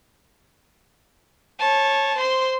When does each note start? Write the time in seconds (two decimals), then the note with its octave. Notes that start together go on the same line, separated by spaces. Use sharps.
1.60 C#5 A5
2.18 C5 C6